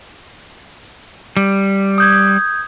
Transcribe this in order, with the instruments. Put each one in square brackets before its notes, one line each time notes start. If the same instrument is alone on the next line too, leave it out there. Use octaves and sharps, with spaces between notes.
[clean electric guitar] G3
[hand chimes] D#6 G6 G#6